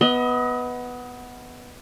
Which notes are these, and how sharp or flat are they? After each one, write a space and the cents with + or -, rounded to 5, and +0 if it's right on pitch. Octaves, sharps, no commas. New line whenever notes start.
B3 +0 D#5 +35